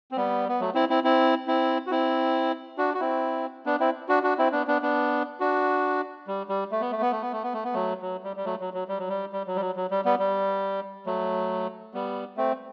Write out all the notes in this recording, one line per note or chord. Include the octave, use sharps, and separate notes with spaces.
C4
G3 B3
B3
F#3 A3
C4 E4
C4 E4
C4 E4
C4 E4
F#4
C4 E4
D4 F#4
F#4
C4 E4
B3 D4
C4 E4
D4 F#4
D4 F#4
C4 E4
B3 D4
B3 D4
B3 D4
D4 F#4
G3
G3
A3
B3
A3
B3
A3
B3
A3
B3
A3
B3
F#3 A3
F#3
G3
G3
F#3 A3
F#3
F#3
G3
F#3
G3
G3
F#3
G3
F#3
F#3
G3
G3 B3
G3
F#3 A3
G3 B3
A3 C4